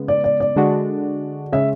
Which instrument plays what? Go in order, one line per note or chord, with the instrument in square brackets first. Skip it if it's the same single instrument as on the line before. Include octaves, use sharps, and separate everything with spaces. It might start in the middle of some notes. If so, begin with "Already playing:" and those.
Already playing: [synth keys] C#3 G#3 B3
[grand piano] D5
D5
D5
[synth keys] D3 G#3 D4 F#4
[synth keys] C#3 G#3 C#4 [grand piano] E5